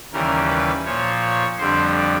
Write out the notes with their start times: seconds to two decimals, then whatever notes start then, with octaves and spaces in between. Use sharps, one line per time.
0.13 D#2 C#3 E3 G3 A#4
0.48 B4
0.85 A#2 F3 C#5
1.22 C#5
1.58 F2 D3 G3 C5